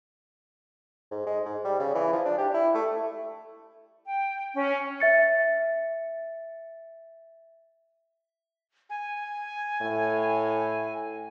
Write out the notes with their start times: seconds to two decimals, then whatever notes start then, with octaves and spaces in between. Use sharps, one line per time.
1.11 G#2
1.26 G#3
1.45 G#2
1.64 G3
1.79 C#3
1.95 E3
2.13 F3
2.25 D4
2.38 G4
2.54 E4
2.74 A3
4.06 G5
4.55 C#4
5.00 E5 A6 C#7
8.90 G#5
9.82 A2